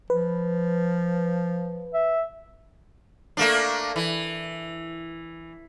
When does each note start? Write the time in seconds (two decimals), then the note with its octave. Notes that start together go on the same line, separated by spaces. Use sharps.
0.10 F3 B4
1.94 E5
3.37 A3 A#3 D4
3.96 E3